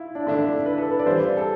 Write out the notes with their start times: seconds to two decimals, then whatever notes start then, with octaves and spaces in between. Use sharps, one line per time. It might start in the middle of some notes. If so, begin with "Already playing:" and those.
Already playing: E4 F4
0.15 D4
0.27 D3 A3 D4 E4
0.66 B4
0.78 A4
0.90 B4
0.99 D5
1.06 E3 G3 D4 F4 C5
1.37 A4